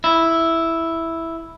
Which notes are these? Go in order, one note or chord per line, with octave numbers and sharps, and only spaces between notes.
E4